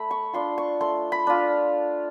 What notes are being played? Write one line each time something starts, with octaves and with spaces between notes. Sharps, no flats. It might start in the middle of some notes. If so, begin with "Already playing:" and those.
Already playing: A3 B5
C#6
D4 F4 C6
C#6
A3 C6
B5
D4 F4